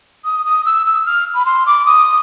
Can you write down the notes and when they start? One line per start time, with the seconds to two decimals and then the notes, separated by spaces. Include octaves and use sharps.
0.25 D#6
0.46 D#6
0.66 E6
0.86 E6
1.06 F6
1.35 B5
1.46 C6
1.66 D6
1.86 D#6